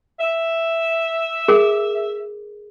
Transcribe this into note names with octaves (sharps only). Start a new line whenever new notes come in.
E5
G#4 A#4